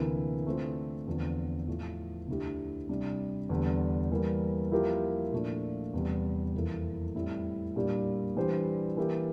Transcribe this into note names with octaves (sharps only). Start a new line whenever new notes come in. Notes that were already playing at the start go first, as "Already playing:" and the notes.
Already playing: D2 C3 E3 A#3
D3 A3 C4 F4 C5
E2 D3 F3 C4
A2 F3 A3
D2 D3 A3 E4 G4
C3 G3 D4
E2 D3 G3 D4
E3 G3 A#3
F3 A#3 E4 G4 A#4
A#2 F3 A3 D4
E2 C3 G3
F2 E3 A#3 E4 A4
A2 G3 C4 E4
A#2 G3 D4 G4
E3 G3 D4 G4 C5
E3 A#3 E4 G4